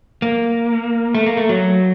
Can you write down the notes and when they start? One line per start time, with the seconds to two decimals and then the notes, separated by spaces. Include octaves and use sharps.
0.22 A#3
1.15 A3
1.26 A#3
1.37 A3
1.49 F#3